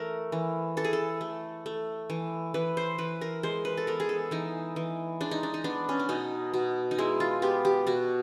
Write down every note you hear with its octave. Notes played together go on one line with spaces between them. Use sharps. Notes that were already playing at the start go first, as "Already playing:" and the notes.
Already playing: E3 A3 A#4
E3
E3 A4
G#4
A4
A3
A3
E3
E3 B4
C5
E3 B4
A#4
G#3 C5
B4
A4
B3 A#4
G#4
A4
E3 D#4
E3
G#3 D4
D#4
D4
D#4
B3 D4
C#4
D4
B2 D#4
B2
D#4
G#3 E4
F4
B3 G4
G4
B2 F#4